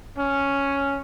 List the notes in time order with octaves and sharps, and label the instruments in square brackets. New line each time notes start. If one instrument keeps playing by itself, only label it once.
[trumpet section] C#4